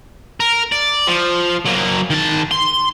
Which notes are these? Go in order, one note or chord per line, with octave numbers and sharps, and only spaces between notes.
A#4
D5
F3
F#3 A#3
D#3 A5
C6